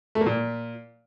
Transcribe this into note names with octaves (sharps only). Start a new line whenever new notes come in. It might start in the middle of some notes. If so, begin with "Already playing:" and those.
A3
A#3
A#2